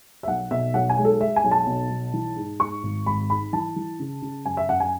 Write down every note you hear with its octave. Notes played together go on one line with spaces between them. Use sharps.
E5
B1 F#5
B2 E5
B1 F#5
G#5
G#3
A4
G#3 E5
G#5
B1
A5
B2
B1
E3
G#2
G#2 C#6
G#1
G#1 B5
G#2 B5
E3 A5
E3
C#3
C#3
F#2 G#5
E5
F#2 F#5
G#5